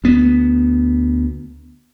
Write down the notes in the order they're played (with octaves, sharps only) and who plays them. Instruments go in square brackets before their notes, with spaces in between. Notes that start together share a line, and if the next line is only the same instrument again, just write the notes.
[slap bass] D2 B3